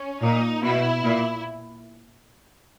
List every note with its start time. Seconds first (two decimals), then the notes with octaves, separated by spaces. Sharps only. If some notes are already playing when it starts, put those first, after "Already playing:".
Already playing: C#4
0.22 A#2 D#4
0.62 B2 E4
1.03 A#2